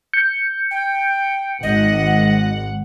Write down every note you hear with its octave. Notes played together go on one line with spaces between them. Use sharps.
G6 C#7
G5
G#1 D#5 F#5